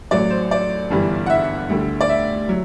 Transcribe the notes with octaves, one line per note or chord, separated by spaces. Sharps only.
A1 A2 F#3 D5
C5
D5
G1 G2 E3 G3
F#5
E5
D2 D3 G3
D5
E5
F#3